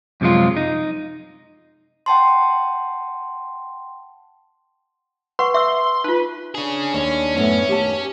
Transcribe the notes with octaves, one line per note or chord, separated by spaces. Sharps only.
F#2 C3 F3 G#3 F4
D#4
F#5 G5 A5 C6
B4 F#5 C6 C#6
E5 C6 D6 E6
D#4 F4 B4
C#4 D4 G#4
D#2 C#4
F#2 A2 B3 C#4
D#2 G4 A5